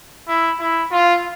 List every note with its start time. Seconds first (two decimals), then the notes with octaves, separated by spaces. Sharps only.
0.28 E4
0.60 E4
0.92 F4